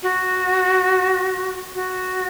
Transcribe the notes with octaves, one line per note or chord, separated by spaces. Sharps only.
F#4
F#4